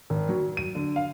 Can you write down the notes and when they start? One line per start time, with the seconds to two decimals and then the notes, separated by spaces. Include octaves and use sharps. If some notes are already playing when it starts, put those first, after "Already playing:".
0.10 G#1
0.29 F#3
0.57 D#7
0.75 D3
0.96 F5